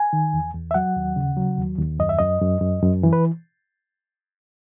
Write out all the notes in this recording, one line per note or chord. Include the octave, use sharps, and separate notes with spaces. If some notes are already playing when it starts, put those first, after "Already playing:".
Already playing: G#5
D#3
E2
E2
E5
F#3 F#5
D#2
C#3
F#3
D#2
D#2
F#2 D#5
E5
F#2 D#5
F#2
F#2
F#2
E3
B4